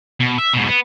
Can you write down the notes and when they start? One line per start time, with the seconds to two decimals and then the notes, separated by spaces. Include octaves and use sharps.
0.20 B2
0.38 E5
0.54 G#2 B2
0.68 B3